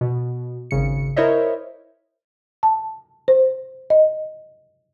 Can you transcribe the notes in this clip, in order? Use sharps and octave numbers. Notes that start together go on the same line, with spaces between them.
B2
G#1 C#3 C#7
E4 A#4 C5 C#5 D#5 E5
A5
C5
D#5